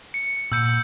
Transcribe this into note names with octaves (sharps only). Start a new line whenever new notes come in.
C#7
A#2 E6 G6 C#7